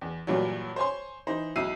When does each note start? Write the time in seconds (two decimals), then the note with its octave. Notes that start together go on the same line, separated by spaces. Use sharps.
0.01 E2
0.27 G2 A#2 E3 F#3
0.76 C5 C#5 G#5 C6
1.27 E3 D#4 C5
1.56 B1 E4 E6 C7 D#7